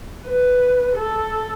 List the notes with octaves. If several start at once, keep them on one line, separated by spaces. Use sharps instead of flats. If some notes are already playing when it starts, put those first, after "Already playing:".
B4
A4